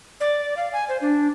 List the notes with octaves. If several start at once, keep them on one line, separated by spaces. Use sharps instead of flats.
D5
F5
G#5
C5
D4